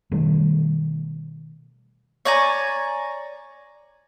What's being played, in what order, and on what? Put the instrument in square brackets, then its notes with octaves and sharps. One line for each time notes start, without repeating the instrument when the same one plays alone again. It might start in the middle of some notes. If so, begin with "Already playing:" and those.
[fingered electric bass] B2 D#3 G3 A3
[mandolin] C#5 D5 G#5 A#5